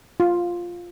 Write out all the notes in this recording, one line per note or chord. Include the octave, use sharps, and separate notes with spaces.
F4